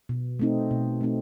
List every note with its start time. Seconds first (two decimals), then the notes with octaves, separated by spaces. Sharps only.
0.09 B2
0.39 A3 C4 D#4
0.71 B2
1.01 A3 C4 D#4